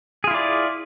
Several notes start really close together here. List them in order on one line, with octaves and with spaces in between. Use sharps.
G#4 F4 E4 D5